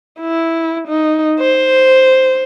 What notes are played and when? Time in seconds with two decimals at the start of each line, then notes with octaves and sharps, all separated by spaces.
0.20 E4
0.88 D#4
1.40 C5